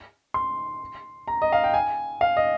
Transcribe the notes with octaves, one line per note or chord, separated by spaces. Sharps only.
C6
A#5
D#5
F5
G5
G#5
F5
D#5